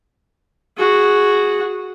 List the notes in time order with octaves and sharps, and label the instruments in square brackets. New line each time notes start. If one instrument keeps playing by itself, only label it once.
[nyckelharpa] F#4 G#4